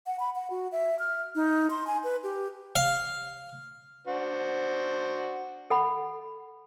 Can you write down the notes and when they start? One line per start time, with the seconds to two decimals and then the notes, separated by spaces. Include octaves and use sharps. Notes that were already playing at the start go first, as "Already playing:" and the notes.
0.07 F#5
0.20 B5
0.35 F#5
0.50 F#4
0.72 E5
0.99 F6
1.35 D#4
1.70 C6
1.87 G#5
2.04 B4
2.23 G4
2.76 F5
4.07 D4 F#4 C5
5.70 A4 F#5 B5